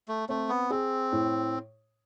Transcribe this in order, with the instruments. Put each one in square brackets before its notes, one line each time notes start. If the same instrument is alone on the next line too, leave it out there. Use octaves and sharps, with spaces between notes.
[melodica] A3
[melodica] A3 [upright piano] C4
[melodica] B3
[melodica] C4 [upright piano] G#4
[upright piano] A2